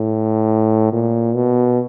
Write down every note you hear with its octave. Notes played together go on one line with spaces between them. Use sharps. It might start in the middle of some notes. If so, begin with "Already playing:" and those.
Already playing: A2
A#2
B2